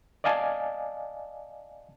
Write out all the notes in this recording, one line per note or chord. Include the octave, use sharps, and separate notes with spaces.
D5 D#5 F5 G#5 A5